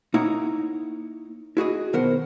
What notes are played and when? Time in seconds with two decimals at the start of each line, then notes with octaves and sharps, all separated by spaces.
0.14 A#3 D#4 E4 C#5 F#5 A#5
1.57 E4 F#4 G#4 D#5
1.93 B1 D#3 B3 A#4 C5 F#5